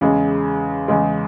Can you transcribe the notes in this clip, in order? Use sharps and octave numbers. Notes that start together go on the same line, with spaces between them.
E2 C#3 G#3
E2 C#3 G#3